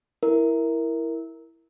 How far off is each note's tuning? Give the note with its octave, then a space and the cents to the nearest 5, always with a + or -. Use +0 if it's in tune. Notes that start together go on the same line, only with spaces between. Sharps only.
E4 +0 A#4 +0